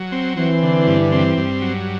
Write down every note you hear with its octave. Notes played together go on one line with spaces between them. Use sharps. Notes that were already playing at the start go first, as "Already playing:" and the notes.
Already playing: F#3
C4
E3 C4
D3
G2
C4
G2
F#3